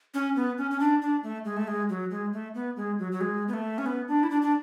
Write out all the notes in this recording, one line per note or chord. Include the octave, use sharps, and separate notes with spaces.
C#4
B3
C#4
C#4
D4
D4
A3
G#3
A3
G#3
F#3
G#3
A3
B3
G#3
F#3
F#3
G#3
B3
A3
C#4
B3
D4
E4
D4
D4